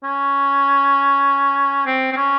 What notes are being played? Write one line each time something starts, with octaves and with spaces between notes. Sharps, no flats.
C#4
C4
C4
C#4